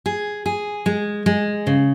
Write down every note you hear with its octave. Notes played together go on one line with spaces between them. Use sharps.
G#4
G#4
G#3
G#3
C#3